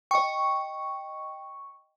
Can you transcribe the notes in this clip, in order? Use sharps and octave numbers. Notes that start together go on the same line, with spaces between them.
D#5 G5 C#6